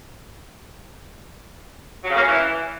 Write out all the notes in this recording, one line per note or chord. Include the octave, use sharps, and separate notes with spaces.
F#3
C#3
A#3
C#4
E3